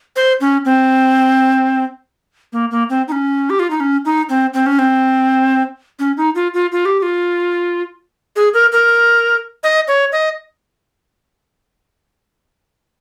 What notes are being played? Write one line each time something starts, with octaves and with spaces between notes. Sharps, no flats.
C5
C#4
C4
A#3
A#3
C4
D#4
C#4
G4
F4
D#4
C#4
D#4
C4
C4
C#4
C4
C#4
D#4
F4
F4
F4
G4
G4
F4
G#4
A#4
A#4
D#5
C#5
D#5